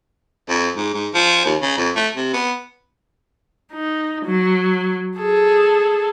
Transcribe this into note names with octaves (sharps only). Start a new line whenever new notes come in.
F2
G#2
G#2
F3
D#2
C#3
F2
A3
C3
B3
D#4
F#3
G#4 A4